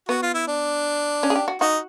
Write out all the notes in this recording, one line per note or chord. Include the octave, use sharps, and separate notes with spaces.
B3 F#4
F4
E4
D4
C#4
G#4
G4
F#4
D#4 F#4